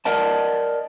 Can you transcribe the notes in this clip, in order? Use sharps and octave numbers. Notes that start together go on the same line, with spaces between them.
A#4 D5 D#5 A5